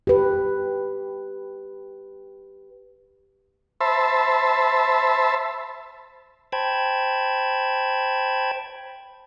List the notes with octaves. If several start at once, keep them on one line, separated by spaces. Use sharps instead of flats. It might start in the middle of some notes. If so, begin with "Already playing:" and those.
G4 B4
C5 E5 A5 B5
C5 G5 A5 B5 G#6